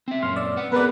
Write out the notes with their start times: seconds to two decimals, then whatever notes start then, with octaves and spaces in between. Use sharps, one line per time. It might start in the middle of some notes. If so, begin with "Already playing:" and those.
0.08 C4 E5
0.23 F#2 A#2 C#4 C6 F6
0.36 D5 E6
0.57 B4 F#5
0.72 B3 C4 G#4 A#4 B4 D5